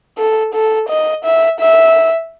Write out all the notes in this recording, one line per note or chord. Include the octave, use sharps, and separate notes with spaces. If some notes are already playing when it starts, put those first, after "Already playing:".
A4
A4
D#5
E5
E5